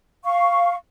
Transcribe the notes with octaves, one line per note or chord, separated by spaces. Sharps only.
F5 C#6